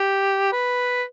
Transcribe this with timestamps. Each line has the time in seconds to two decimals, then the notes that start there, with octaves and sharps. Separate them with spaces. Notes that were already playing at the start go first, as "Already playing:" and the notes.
Already playing: G4
0.52 B4